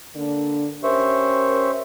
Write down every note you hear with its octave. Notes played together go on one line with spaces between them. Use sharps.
D3 A#3 D4
C#4 G4 A#4 C5 E5 C#6